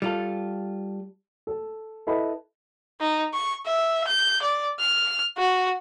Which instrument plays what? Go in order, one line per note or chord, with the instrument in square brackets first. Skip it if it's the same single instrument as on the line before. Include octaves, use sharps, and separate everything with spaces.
[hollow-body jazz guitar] G3 F4 A4
[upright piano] A4
E4 A4 B4 D#5 B5
[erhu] D#4
C#6
E5
G6
D5
F6
F#4